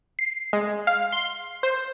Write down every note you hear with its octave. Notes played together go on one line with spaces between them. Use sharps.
C7
G#3
F5
C6
C5